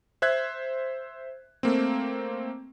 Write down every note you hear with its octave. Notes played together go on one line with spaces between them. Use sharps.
C5 E5 F#6 G#6
A3 A#3 C4